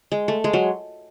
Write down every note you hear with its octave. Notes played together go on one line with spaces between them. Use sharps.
G#3
A3
G#3
F#3